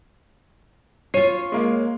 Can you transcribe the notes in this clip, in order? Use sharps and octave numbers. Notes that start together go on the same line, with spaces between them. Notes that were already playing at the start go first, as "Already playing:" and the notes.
F4 C#5 C7 D#7
G#3 A#3